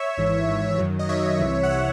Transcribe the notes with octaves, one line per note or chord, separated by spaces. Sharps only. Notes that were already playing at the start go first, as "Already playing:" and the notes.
Already playing: C#5 E5
G#1 G#2 E3
G#1 G#2 E3
F#2 D#3 F#3
D#5
F#2 D#3 F#3 C#5 E5
C2 C3 E3
F#5
C3 E3 C#5 E5